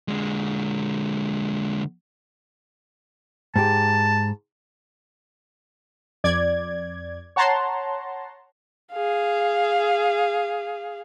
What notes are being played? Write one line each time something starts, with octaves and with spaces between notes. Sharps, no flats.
D3 G#3
G#2 G4 A5
F2 D5 G#6
C#5 F#5 A5 A#5 C6
G#4 F5